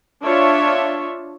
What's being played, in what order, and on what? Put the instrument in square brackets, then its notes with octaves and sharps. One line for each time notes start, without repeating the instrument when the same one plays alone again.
[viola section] D4 F4 C#5 E5